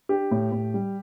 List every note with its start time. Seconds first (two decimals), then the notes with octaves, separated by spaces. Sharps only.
0.09 D4 G4
0.31 A2
0.52 A2
0.74 G3